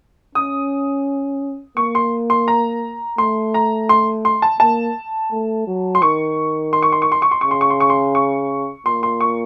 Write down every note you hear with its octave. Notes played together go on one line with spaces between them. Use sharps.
C#4 D#6
A#3 C#6
C6
C6
A#5
A3 C6
A#5
C6
C6
A5
A#3 A5
A3
F#3
C6
D#3 C#6
C6
C#6
C6
C#6
C6
C#6
C6
C#3 C#6
C6
C#6
C6
C#6
C6
C#6
A#2 C6
C6
C#6